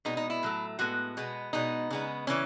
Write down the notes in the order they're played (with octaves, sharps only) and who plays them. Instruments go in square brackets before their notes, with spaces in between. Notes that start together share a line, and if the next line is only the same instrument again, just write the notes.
[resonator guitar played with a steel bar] B2 G#3 B3 D#4
D#4
E4
A2 F#3 A3
A2 G#3 B3 F#4
B2 G#3 B3
B2 G#3 B3 D#4
C#3 G#3 B3
C#3 E3 C#4